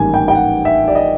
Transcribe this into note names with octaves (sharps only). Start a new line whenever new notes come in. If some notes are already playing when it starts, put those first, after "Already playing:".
Already playing: A1 G#2 D#3 G3 A#3 G#5
G5
G5
F#5
E5
D5
D#5